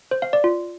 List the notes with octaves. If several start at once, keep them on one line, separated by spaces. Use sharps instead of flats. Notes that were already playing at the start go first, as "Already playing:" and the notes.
C5
F5
D5
F4